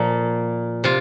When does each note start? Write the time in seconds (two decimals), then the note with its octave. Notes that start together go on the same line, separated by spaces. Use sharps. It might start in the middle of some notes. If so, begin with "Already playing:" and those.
Already playing: A#2 F3 A#3
0.84 C3 F4